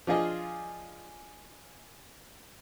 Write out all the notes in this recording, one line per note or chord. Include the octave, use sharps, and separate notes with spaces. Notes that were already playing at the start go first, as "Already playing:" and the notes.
F3 D4 F4 G#4 D#5